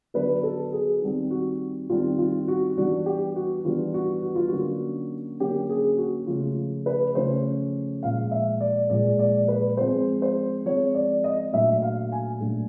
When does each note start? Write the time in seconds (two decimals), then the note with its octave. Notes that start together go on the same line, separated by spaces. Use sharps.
0.14 D3 F#3 B3 D4 B4
0.44 A4
0.73 G#4
1.01 D#3 G3 C4
1.31 F#4
1.90 D#3 G3 C4 F4
2.18 F4
2.48 F#4
2.77 E3 G3 B3 D4 F#4
3.06 G4
3.36 F#4
3.65 E3 G3 B3 D4 F4
3.94 F#4
4.23 F#4
4.36 F4
4.49 D3 F#3 A#3 C#4 F#4
5.40 D3 F#3 A#3 C#4 G4
5.69 G#4
5.98 F#4
6.27 C#3 F3 A3 C#4 F4
6.86 B4
7.15 C#3 F3 A3 C#4 C5
8.03 A#2 F3 G#3 F5
8.31 E5
8.61 D5
8.90 A#2 F3 G#3 D5
9.19 D5
9.48 B4
9.77 F3 G#3 C4 C5
10.22 C5
10.66 F3 G#3 C4 C#5
10.95 D5
11.24 D#5
11.53 A#2 F#3 A3 D4 E5
11.82 F5
12.12 G#5
12.40 A#2 F#3 A3 D4